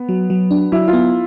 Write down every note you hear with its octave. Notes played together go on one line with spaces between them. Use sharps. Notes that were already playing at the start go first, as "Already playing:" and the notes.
Already playing: B3
F#3
F#3
D4
F#3 E4
F4
B3